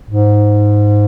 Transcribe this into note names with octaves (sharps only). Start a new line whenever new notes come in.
G#2